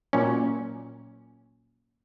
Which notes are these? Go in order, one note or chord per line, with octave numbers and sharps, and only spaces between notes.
A#2 F#3 C#4